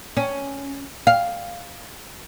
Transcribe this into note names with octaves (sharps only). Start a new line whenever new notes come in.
C#4
F5